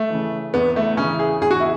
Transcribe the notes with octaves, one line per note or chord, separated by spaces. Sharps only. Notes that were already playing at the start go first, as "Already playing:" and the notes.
Already playing: A3
C#3 E3
E2 B3
A3
C#3 E3 C#4
G#4
E2 G#4
F#4
E4